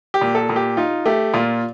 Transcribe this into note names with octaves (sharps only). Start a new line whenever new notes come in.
G4
A#2
A4
A#2
G4
D#4 F4
A3 G4
A#2 F4